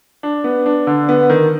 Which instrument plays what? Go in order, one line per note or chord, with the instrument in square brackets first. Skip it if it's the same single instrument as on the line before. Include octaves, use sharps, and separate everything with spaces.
[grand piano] D4
B3
D4
D3
B3
D#3